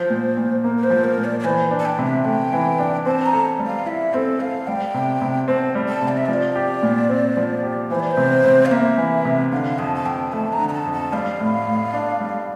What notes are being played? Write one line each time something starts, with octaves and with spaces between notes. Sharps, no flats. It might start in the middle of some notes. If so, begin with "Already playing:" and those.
Already playing: F3 C5
A#2
A#2
A#3 A#4
A#4
C5
F3
A#4
A#2
D5
D5
E3 C5
D4
A5
G5
C3
E5
A3 G5
E3
D4
C4 A5
A#5
A4
G3
F5
E4 E5
C4 A4
A4 F5
G3 G5
C3
C3
C4 A5
G3
A5
C3
D5
E5
F3 D5
G4
A#2
C4
F3
G4
E3 C5
D5
C5
C3
C3
F5
A#3 E5
E3
C3
D3 F5
F2 A5
A5
F2 G5
A3 A5
A#5
D3
A#5
A5
F2
A5
G3 F5
A2
A2
D4
G3